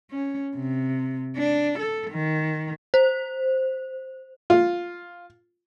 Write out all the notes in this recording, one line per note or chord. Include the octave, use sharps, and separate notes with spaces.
C#4
C3
D4
A4
D#3
C5
F4